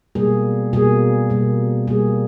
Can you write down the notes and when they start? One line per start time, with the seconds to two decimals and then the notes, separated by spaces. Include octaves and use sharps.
0.15 B2 G3 A#3 G#4
0.73 B2 G3 A#3 G#4
1.30 B2 G3 A#3
1.88 B2 G3 A#3 G#4